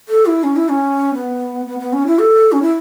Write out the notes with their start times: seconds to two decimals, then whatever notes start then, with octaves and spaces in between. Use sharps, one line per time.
0.09 A4
0.26 E4
0.43 C#4
0.56 E4
0.69 C#4
1.14 B3
1.66 B3
1.79 B3
1.93 C#4
2.06 E4
2.19 A4
2.52 C#4
2.62 E4